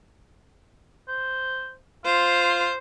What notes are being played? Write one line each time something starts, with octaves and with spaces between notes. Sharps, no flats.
C5
F4 C5